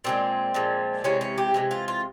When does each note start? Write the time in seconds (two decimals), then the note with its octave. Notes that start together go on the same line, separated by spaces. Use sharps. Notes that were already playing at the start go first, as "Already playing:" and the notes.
0.04 A#2 F3 G#3 C4
0.54 A#2 F3 G#3
1.04 C3 E3 G#3 C#4
1.21 C#4
1.38 G4
1.54 C3 E3 G#3
1.71 F4
1.88 F4